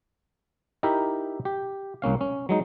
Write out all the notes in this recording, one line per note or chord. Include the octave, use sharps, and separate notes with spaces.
D#4 E4 G4 A#4 E5
G4
C2 A#3 C#4 F5
C#4
F#3 G#3 D#4